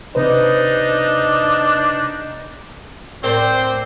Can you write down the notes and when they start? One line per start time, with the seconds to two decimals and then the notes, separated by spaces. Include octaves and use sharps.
0.15 C3 D4 D#4 B4 C5
3.23 A2 C4 A#4 C5 D5